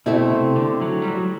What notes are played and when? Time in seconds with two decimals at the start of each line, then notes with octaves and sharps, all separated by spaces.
0.06 B2 A3 C4 E4
0.30 C3
0.56 D3
0.81 F#3
1.02 G3
1.08 F#3